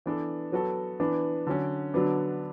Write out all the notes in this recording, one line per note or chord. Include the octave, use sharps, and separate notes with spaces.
E3 B3 D4 A4
F#3 B3 F#4 A4
E3 B3 D4
D3 F#3 C#4
D3 F#3 B3 D4